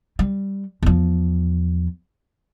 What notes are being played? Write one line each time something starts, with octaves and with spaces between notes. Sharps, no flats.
G3
E2 F3